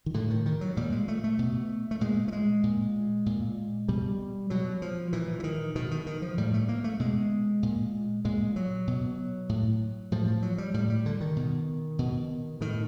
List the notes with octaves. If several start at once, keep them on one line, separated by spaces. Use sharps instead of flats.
D#3
A2 D3
D#3
D#3
F#3
A#2 G3
G#3
A3
A3
B2
A3
A#2 G#3
A3
G#3
A#2
A#2
B2 G3
B2 F#3
F3
A#2 E3
E3
D#3
B2 D#3
D#3
D#3
F3
A2 G3
A3
A#3
A3
B2 G#3
A#2
A#2 G#3
F#3
B2
A2
A2 F3
F3
F#3
G3
A2 G3
G3
D3
D#3
B2
B2
A2 D#3